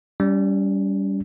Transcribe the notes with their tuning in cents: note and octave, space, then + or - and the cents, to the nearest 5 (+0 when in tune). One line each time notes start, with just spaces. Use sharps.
G3 +0 C#4 +40